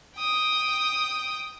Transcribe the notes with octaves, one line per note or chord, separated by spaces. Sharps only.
G5 D#6